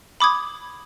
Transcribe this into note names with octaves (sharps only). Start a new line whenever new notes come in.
B5 D6 D#6 G#6